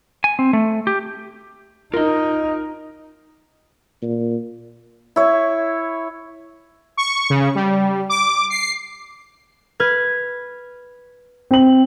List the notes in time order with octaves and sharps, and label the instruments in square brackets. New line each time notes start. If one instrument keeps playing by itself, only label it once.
[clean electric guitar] G#5
C4
A3
G4
[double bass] D#4 [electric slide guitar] F4 D#5 [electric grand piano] A#4
[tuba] A#2
[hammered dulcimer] E4 C#5
[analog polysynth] C#6
C#3
G3
D6
C7
[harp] B4 F6 G#6
[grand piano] C4 F#7